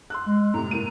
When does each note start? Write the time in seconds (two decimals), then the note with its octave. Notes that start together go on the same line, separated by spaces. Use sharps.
0.10 C6 E6 F#6
0.26 G#3
0.54 A2 C3 A#5
0.71 A2 A#3 D#7